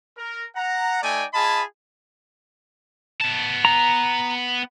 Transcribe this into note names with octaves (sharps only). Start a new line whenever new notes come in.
A#4
F#5 A#5
A3 D#4 D5 G5 G#5
F4 G#4 D#5 G#5 A5 B5
B3 A5
A#5